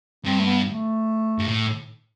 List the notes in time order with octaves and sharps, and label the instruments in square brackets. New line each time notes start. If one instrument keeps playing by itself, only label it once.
[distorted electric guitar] G2 [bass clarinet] C4
[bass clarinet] A3
B3
A3
[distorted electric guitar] G2
A2